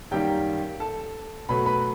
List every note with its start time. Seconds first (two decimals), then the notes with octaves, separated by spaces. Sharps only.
0.11 F#2 D#3 G3 A#3 G4 G5
0.80 A4 A5
1.49 B2 F#3 A3 B4 B5
1.66 B4 B5